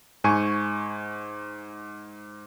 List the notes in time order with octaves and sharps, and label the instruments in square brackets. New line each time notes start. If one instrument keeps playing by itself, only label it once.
[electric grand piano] G#2 G#5 C#6 D#7